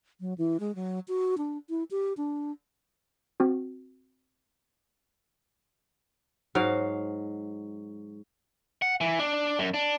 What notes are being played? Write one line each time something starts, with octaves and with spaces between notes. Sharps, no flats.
F#3
E3
G#3
F#3
F#4
D4
E4
G4
D4
C4 F#4
G#2 F#3 F5
F#5
E3
D4
F#2
D4